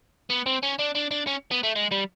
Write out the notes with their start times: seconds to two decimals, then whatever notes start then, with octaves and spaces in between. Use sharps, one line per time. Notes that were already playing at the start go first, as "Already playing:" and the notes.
0.30 B3
0.46 C4
0.63 C#4
0.79 D4
0.95 D4
1.11 D4
1.27 C#4
1.51 B3
1.63 A3
1.76 G#3
1.92 G3